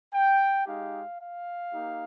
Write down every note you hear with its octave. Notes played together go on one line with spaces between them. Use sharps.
G5
G#3 D#4 G4 F5
F5
A#3 D#4 G4